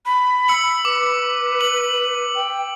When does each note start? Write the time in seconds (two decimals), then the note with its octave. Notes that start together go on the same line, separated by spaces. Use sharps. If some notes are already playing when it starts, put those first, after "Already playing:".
0.06 B5
0.48 E6 C#7 F#7
0.85 B4 D6
1.61 F#7
2.35 G5